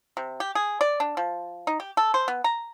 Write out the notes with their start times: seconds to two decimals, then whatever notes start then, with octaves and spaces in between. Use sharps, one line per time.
0.17 C3
0.40 G4
0.55 G#4
0.81 D5
1.00 D4
1.17 F3
1.67 D#4
1.80 G4
1.97 A4
2.14 C5
2.28 B3
2.44 A#5